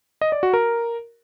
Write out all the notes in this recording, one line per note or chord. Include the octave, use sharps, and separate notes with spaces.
D#5
D5
F#4
A#4